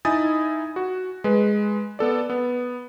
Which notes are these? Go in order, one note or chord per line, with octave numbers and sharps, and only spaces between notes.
D#4 E4 G#5 D#6 A6
F#4
G#3 B4
B3 A4 D5
B3